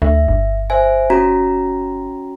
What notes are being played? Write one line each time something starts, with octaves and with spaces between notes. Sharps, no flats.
D2 E5
G1
C5 E5 G#5
C#4 F#4 A#5